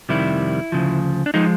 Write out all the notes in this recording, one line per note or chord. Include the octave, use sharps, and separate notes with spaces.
F2 C3 D#3 G3 E4
D2 C#3 F3
D4
F3 G#3 D#4